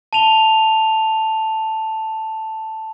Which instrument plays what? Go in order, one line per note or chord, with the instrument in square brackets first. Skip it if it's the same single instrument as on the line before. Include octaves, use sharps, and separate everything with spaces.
[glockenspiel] A5 D#7 F7 G7